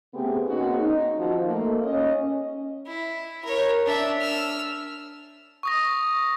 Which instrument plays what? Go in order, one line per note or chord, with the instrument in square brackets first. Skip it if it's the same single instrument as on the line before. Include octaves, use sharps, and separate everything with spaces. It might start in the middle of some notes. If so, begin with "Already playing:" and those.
[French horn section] C#3 A3 B3 C4 G4 G#4
A#3 C4 C#4 D#4 F#4 G#4
D#4
D#3 F3 F#4
A3 A#3 D#5
C#4 D#5
[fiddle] E4
A#4 C#5
D4 E5
E6 F6
[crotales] C#6 D#6 A#6